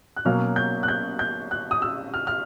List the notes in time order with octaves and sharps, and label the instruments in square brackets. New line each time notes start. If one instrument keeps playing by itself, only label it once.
[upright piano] F#6
B2 F#3 A#3 C#4 F6
G6
F#6
G6
G6
F#6
D#6
E6
F6
F6